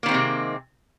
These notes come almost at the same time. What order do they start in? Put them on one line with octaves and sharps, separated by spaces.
A#3 D#3 C4 G#3 C3